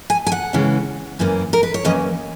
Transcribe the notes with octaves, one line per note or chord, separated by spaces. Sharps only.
G#5
G#5
F#5
C#3 E3 G#3 C#4
F#2 E3 A#3 C#4
A#4
B4
C#5
F#2 E3 A#3 C#4 D#5